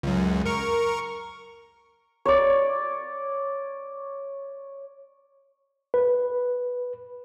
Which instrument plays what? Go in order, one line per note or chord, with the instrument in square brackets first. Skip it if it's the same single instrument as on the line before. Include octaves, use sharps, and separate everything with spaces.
[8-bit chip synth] C#2 F#2
A#4 C#6
[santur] C#5 D5
[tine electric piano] B4